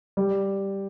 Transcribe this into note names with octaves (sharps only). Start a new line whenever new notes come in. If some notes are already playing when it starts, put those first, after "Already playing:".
G3